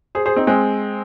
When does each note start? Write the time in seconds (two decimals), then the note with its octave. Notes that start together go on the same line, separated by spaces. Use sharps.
0.15 G#4 C5
0.26 G#4 C5
0.36 C4 D#4
0.47 G#3 C4